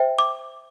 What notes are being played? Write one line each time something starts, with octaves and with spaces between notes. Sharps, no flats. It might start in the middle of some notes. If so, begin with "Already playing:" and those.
Already playing: C5 E5 G5
D6